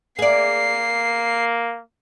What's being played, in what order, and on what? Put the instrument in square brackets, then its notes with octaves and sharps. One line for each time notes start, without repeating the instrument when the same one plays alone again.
[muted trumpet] A#3 [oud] G#4 D5 [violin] C7